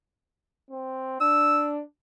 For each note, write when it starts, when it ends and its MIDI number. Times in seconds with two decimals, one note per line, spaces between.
0.71 1.16 60
1.21 1.82 62
1.21 1.69 88